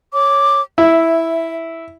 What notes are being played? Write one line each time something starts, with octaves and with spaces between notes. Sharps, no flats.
C#5 D6
E4 E5